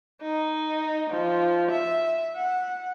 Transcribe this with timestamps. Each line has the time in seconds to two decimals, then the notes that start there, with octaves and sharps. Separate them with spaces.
0.22 D#4
1.11 F3
1.71 E5
2.36 F#5